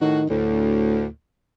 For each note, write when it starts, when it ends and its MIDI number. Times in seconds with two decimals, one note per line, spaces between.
0.02 0.24 45
0.02 0.28 51
0.02 0.24 66
0.30 1.07 38
0.30 1.07 45